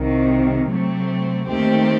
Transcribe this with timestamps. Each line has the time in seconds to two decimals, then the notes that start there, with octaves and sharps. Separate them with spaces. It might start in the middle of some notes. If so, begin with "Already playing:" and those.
Already playing: C2 C3 D#3
0.68 C3 F#3 A3 C4
1.46 D#2 D#3 A3 C4 G4